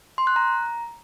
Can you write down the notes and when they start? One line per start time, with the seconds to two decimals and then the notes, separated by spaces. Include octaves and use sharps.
0.18 C6
0.27 F#6
0.36 A#5